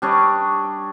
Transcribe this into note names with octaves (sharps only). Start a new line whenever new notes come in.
G3 D4 C#5 D#5